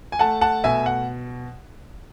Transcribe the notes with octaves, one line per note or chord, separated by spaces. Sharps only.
G#5
A3 F#5 A5
F#5 A5
B2 E5 G#5
F#5